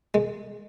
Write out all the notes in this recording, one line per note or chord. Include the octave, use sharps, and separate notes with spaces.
G#3